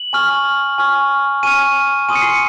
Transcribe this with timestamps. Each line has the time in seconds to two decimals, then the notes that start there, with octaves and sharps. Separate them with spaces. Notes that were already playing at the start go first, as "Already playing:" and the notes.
Already playing: F#7
0.13 G#5 C#6 F6
0.78 G#5 C#6 F6
1.43 G#5 C#6 F6 D#7
2.09 G#5 C6 D#6 D#7
2.15 C#7
2.22 C7
2.30 C#7